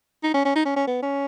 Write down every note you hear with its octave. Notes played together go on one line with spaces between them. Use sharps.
D#4
C#4
C#4
D#4
C#4
C#4
B3
C#4